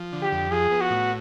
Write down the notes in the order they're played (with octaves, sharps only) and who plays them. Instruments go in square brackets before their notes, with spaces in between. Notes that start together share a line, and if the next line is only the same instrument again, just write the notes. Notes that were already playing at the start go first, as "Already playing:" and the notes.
Already playing: [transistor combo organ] F3
D3
[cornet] G4
[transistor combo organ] F2
[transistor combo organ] F3 [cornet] G#4
[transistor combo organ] B3
[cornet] F#4
[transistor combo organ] A2